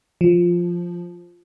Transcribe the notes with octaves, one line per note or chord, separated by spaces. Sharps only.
F3